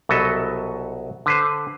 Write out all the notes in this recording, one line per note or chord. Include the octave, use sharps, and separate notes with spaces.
C2 B2 F#3 A4 D#5 E5
D3 B4 C5